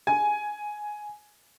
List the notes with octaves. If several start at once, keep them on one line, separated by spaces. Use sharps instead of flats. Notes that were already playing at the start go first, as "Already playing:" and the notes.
G#5